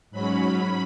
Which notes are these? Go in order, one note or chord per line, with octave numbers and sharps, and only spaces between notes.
G#2 F#3 C#4 B5